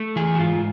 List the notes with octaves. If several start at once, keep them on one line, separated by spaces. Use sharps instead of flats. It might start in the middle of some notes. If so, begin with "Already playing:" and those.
Already playing: A3
E3 G#4
F#4
G#2 F4